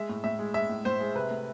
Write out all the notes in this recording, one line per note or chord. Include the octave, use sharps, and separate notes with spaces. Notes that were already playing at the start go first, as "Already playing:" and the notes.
Already playing: G#3 E5
A2
A2 E5
G#3
G#3 E5
A2
A2 C5
G#3
C3 B4
A3